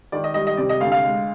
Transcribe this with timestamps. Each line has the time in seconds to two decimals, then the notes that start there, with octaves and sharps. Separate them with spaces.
0.12 D#3 D5
0.24 D#5
0.34 G3 D#5
0.47 D#5
0.57 C3 D5
0.69 D#5
0.80 D2 F5
0.92 F5
1.03 G#3